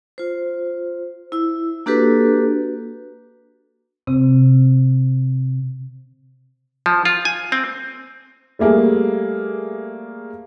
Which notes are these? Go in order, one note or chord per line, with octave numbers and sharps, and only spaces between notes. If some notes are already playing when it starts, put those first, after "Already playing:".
F4 C5
E4 E6
A#3 D4 F#4 G4 A4 B4
C3 C4
F3
F4
G#5
C4
G3 A3 A#3 G#4